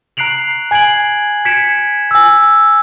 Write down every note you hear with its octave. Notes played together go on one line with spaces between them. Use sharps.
A#5 F#6 C7 D7 F7 F#7
G#5 G#6 C7 D7 F#7
G#6 B6 C#7 D7 E7
G#5 E6